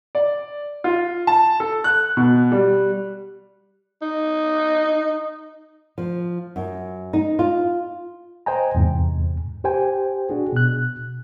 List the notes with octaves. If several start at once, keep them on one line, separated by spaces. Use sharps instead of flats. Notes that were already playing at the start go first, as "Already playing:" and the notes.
D5
F4
A5
A4
F#6
B2
G3
D#4
F3
F#2
D#4
F4
C5 D#5 G5 G#5 A#5
E2 G#2 C3
G4 C5 G5 G#5
D4 F#4 G#4
B2 F#6